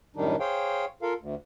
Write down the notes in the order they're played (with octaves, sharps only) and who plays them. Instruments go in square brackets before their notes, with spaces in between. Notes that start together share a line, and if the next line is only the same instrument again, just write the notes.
[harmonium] F#2 A2 D#3 G3 D4 D#4
G#4 C5 C#5 F5 G5
F4 A4 A#4 F5
D2